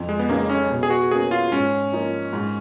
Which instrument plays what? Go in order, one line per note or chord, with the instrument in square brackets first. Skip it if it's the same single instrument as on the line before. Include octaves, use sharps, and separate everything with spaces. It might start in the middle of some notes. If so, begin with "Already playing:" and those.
Already playing: [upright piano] F2
[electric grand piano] G#3
B3
[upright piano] C#3 G#3 D#4 G#4 [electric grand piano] A#3
[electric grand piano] C#4
[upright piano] B2
[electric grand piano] G#4
F#4
[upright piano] A#3 C#4 F#4 [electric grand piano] G#4
[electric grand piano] F4
[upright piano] G#2 [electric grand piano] C#4
[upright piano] F3 A#3 D#4
G#2